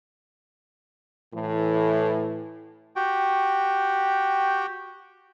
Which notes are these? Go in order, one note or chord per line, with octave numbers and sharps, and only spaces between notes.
A2 E3
F#4 G4 G5